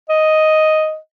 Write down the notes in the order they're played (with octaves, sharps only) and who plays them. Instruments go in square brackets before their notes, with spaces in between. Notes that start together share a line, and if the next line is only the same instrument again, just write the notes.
[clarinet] D#5